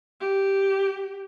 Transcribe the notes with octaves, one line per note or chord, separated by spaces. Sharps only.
G4